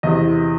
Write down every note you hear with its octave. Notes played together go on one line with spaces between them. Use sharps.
E2 C3 E3 D#5